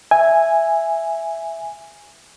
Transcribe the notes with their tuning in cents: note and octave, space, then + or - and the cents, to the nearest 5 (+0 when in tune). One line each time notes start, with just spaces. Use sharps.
E5 +5 G#5 -5